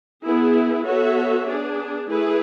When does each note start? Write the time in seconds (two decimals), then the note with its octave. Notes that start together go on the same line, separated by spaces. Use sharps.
0.25 B3 E4 G#4
0.86 B3 F#4 A4 C#5 E5
1.47 B3 D4 G#4
2.08 A3 E4 G#4 B4